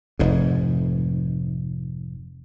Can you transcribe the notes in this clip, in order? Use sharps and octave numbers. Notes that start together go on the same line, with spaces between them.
F1 G#2